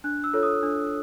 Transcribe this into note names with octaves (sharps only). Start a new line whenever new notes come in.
D4 F#6
E6
F4 A4 C#5
D#6
D4